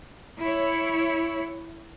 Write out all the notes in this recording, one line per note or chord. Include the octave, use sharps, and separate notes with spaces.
E4 C#5